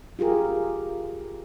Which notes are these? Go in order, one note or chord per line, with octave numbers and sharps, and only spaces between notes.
F4 G4 G#4 A#4